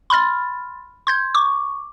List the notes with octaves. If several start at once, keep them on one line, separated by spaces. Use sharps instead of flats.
B5 C6 F6 A6
C6 G6 G#6
C#6 D6